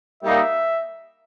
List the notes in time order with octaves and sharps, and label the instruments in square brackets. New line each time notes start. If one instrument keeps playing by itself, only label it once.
[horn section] G3 A#3 D#4 [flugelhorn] E5